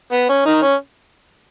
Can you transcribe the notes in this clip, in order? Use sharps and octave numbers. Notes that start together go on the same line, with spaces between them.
B3
C#4
D#3 D#4
C#4